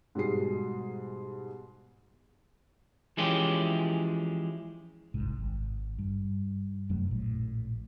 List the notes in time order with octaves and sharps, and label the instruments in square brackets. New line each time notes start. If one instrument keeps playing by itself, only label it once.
[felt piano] G#2 B2 G3 G#4 C7
[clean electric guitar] E3 F3 G#3 C#4 E4 G4
[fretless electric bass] G1 C2 G#2
G#1
G2
F1 F#2 F#3 A3
A#1 A2